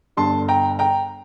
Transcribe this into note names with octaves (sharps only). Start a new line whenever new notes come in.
G1 G2 D3 A5 C6
G5 A#5
G5 A#5